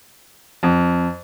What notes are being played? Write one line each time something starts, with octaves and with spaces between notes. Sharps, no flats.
F2